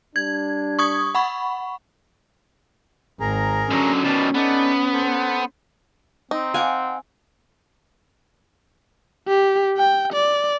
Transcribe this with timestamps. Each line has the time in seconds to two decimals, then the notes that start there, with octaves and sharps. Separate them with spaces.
0.16 G3 D4 G#6
0.79 C#6 D#6 G#6
1.15 F#5 B5 C#6
3.20 G#1 G#4 A#4 A#5
3.71 D3 F#3 C#4
4.04 B2 D#3 B4 D5 A5
4.35 B3 D#4 A4 D5
4.93 A4 C5
6.31 C4 D#4
6.54 F5 F#5 G#5 D6
9.28 G4
9.77 G5
10.13 D5